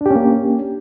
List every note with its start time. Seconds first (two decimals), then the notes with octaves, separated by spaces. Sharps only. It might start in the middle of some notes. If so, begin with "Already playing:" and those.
0.01 D4
0.06 G4
0.10 C#4
0.15 A#3